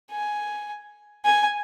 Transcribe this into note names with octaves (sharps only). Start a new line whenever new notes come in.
G#5
G#5